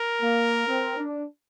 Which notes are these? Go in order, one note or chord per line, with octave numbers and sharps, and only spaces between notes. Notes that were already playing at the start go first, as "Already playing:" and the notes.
Already playing: A#4
A#3
C4
D4